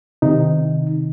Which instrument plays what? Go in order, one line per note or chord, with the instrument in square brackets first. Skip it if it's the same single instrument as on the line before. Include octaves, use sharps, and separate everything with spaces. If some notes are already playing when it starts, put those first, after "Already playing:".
[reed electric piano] C3 D#3 D#4